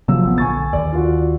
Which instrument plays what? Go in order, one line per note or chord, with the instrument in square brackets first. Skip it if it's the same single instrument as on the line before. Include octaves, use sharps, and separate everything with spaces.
[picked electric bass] C3 F#3 A#3 [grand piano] F3 E6
[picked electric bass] G#1 B3
[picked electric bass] A#1 D3 [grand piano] G#5 C#6 A6
[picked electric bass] D#2 [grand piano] D5
[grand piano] F4 F#4